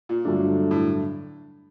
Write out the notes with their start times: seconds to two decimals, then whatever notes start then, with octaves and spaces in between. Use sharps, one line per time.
0.09 A#2
0.25 G2 D3 F#3 A3 D4
0.71 A2